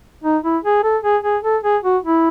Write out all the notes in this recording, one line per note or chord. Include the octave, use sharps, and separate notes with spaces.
D#4
E4
G#4
A4
G#4
G#4
A4
G#4
F#4
E4